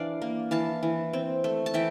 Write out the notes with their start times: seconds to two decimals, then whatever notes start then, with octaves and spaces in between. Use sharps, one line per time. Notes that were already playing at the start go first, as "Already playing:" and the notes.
Already playing: E3 D4 D5 F5
0.22 A#3
0.51 E3 F5 A5
0.83 E3
1.13 C4
1.44 A3
1.66 A5
1.74 E3 E5 G5